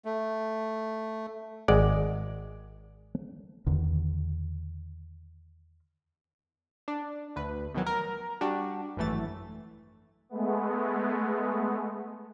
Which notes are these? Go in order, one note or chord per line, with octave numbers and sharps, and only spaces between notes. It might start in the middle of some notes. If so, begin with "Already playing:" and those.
A3
G#1 G#3 D5 F#5
E2 D3 D#3
D4
D2 B4
B2 D#3 E3 F#3
A#4
G3 D4 F#4 G4
G#1 F#2 E3 A3 A6
G#3 A3 B3